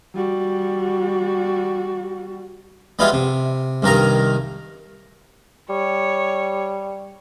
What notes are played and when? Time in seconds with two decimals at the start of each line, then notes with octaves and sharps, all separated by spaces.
0.15 G3 F#4
2.99 G3 G#3 B3 E4 F4
3.13 C3
3.82 C2 G2 D#3 A#4 A#5
5.69 G3 C#5